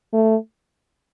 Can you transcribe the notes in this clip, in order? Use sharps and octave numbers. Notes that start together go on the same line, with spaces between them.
A3